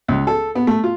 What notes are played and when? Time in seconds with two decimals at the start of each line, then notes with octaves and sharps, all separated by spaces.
0.08 C#2
0.27 A4
0.55 B3
0.67 A3
0.84 F4